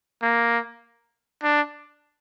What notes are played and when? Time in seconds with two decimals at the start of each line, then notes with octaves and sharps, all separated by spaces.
0.22 A#3
1.43 D4